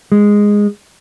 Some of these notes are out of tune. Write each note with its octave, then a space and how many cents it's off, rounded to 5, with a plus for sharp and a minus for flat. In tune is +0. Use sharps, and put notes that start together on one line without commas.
G#3 -10